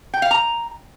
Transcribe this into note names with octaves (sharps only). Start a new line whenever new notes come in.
G5
F5
A#5